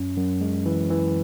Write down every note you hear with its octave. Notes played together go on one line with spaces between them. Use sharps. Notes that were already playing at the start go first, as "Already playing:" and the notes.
Already playing: F#2 C#4
F#2
G#3
E3
E3